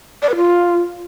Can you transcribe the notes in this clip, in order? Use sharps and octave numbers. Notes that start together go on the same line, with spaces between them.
D5
B4
F4